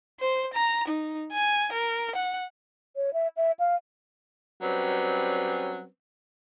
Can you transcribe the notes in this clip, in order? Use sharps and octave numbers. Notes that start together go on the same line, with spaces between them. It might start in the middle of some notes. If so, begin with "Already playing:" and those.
C5
A#5
D#4
G#5
A#4
F#5
C#5
E5
E5
F5
F#3 G3 C4 C#4 B4